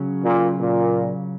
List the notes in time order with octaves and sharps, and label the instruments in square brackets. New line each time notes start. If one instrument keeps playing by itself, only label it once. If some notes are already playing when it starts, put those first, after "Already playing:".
Already playing: [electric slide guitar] C#3 F#3 C#4
[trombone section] A#2
A#2